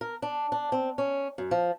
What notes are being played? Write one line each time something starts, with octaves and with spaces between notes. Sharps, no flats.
A#4
D4
D4
C4
C#4
F#2
F3